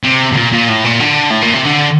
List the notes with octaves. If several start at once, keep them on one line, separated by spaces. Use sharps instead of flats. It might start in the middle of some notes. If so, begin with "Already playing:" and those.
C3
C3
A#2
A#2
A2
A#2
D3
A2
A#2
C3
D3